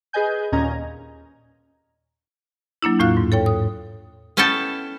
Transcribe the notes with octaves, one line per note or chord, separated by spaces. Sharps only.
G#4 B4 D#5 G#5 G6
D#2 A#2 C#4 D#5 A#5 G#6
F#3 A#3 D4 E4
E2 A2 F4 F5 F#6
G#2
A4 C#5 G5
D#6
B3 C#4 E4 A4 G5 A5